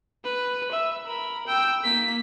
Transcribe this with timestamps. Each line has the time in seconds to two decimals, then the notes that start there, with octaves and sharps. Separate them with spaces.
0.24 B4
0.71 E5
1.06 A#4 B5
1.47 G5 E6
1.84 A#3 B6